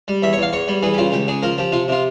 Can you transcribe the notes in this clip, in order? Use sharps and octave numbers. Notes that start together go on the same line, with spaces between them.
G3
E2 E5
C#5
E2 F5
E2 C#5
G3
E3 G#4
G4
C#3 F4
C#2 G4
C#3 G#4
F3 A#4
F3 G4
C3 F4
C3 F4